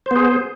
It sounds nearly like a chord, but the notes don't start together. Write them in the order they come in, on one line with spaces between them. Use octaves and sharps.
C5 B3 G#4